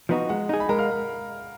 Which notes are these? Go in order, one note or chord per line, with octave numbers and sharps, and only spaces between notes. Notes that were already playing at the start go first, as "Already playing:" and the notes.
F3 B3 D#4 F#4
G#3 F#5
D#4 G#4
B5
G#3 A#4 A#5
F5 F6